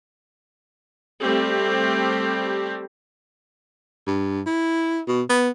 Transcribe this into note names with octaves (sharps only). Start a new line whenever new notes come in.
G3 A3 C4 G4
G2
E4
B2
B3